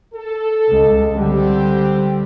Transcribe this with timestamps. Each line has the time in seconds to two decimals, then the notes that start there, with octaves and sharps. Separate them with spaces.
0.14 A4
0.68 C#2 G#3
1.15 D3 G3 C4 G4